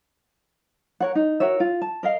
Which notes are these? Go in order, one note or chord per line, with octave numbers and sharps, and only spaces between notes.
A#4 C#5 F#5
D#4
F#4 A#4 C#5 E5
F4
A5
A#4 D#5 F5